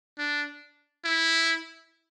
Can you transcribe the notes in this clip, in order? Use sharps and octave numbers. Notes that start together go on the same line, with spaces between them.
D4
E4